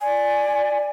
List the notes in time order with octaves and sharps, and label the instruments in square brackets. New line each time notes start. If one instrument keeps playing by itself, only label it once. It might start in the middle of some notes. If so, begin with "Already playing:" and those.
[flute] D5 [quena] G#5